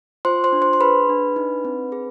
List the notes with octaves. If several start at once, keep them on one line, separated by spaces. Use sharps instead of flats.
F4 C5 C6
C5 C6
D4
C5 C6
C6
G#4 B4 B5
D4
D#4
C4
G#4